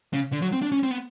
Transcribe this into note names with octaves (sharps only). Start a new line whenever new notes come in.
C#3
D3
F#3
C4
D4
C#4
C4
B3